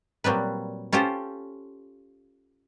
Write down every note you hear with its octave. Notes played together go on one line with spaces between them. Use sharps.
A#2 F#3 G3 C4 B4
C#4 F4 G4 A4 C5